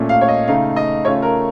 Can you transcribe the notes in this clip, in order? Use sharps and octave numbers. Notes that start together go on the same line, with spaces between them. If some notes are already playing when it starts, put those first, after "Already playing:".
Already playing: A#2 A3 C#4
F5
C#5
D#5
C#3 A3 D#4 F5
D#5
C#3 A3 C#4 F4 C#5
A#4